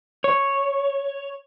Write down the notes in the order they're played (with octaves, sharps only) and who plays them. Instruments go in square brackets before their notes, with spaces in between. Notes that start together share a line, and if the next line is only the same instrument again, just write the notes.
[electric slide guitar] C#5